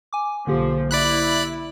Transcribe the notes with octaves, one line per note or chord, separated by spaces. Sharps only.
G#5 D6
B1 D3 F3 A#3 G4
E4 D5 B5 F#6